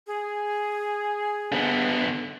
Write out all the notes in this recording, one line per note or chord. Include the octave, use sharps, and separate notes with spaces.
G#4
D3 B3